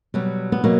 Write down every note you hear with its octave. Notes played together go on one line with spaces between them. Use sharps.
B2 F#3 G3
B3
B2 F#3 A#3